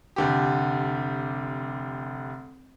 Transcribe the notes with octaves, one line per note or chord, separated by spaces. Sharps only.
F1 D3 G4